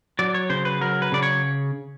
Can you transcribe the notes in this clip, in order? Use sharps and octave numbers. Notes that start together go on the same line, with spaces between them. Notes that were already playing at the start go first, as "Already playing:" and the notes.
F#3 D5
C#5
C#3 C5
B4
F#3 A#4
B4
C#3 D5
C#5